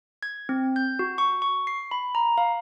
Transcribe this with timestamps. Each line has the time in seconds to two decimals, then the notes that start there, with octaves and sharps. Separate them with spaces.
0.23 G#6
0.49 C4
0.76 G6
0.99 F#4
1.18 C#6
1.42 C#6
1.67 C7
1.91 B5
2.15 A#5
2.38 F5